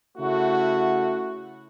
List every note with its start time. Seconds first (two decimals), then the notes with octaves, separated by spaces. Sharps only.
0.18 C#3 A3 E4 F#4